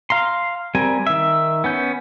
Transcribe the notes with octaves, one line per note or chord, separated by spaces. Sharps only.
F5 A#5 C6
G3 C4 A#4 G#5
D#3 E5
B3 C#4 G6